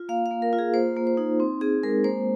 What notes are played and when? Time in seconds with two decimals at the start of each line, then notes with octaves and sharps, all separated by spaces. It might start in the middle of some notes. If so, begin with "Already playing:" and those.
Already playing: F4
0.09 A#3 F5
0.26 F5
0.31 A#3
0.42 A#4
0.53 F4
0.59 G#4
0.74 A#3 C5
0.96 A#3
1.07 C5
1.17 D#4
1.40 C4
1.61 C4 G#4
1.83 G#3 A#4
2.04 A#3 C5